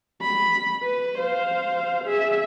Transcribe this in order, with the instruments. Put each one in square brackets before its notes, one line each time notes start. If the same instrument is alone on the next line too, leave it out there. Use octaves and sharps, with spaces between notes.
[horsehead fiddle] B5
B4
C5 F5
G#4 E5